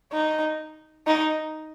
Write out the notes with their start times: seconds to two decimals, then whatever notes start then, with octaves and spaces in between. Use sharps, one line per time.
0.13 D#4
1.07 D#4